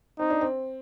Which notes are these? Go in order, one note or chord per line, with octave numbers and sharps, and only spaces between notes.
C4 D#4
D4
C4